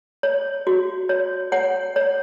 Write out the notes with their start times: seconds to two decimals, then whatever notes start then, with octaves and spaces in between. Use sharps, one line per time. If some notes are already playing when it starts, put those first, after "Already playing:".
0.23 C#5
0.67 F#4
1.09 C#5
1.52 C#5 F#5
1.96 C#5